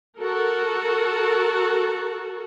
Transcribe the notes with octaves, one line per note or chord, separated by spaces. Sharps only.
F#4 A4 A#4